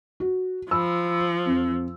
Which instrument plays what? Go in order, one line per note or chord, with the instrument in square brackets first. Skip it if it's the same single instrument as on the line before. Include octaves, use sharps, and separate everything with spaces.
[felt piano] F#4
[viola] F3 [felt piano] B5 E6
[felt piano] F2